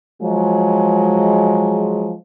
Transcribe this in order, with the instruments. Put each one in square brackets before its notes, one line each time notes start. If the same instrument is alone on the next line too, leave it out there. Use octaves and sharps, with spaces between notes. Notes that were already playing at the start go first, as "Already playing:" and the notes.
[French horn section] F3 F#3 G#3